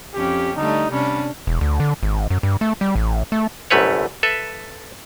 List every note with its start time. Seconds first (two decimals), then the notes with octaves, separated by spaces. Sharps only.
0.14 F2 C#4 G4
0.57 D3 G3 A3 D#4
0.91 C3 G3 C#4 D4
1.47 E1
1.61 D2
1.80 D3
2.03 G#1
2.30 F#2
2.43 G2
2.61 A3
2.81 G3
2.95 A1
3.32 A3
3.71 G1 C2 F#2 A3 B4 C#5
4.23 A4 B4 E5